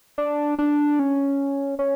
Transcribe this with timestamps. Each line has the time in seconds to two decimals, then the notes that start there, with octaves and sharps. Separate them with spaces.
0.18 D4
0.59 D4
0.99 C#4
1.79 C#4